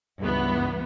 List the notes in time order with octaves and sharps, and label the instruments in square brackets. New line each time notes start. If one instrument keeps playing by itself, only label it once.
[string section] C#2 G2 E3 B3